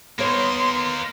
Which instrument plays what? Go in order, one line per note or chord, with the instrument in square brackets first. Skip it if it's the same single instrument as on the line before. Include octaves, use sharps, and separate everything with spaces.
[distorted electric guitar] A#3 D#4 [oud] B3 C#5 [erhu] C6